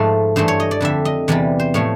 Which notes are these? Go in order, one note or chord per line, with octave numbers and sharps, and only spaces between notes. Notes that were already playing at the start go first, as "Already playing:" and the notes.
Already playing: G#2 F3 A3 B4
G2 E3 A3 C5
C#5
D#5
D5
F2 D3 G3 E5
D#5
E2 C3 E3 G3 D5
C5
A2 F3 A3 C#5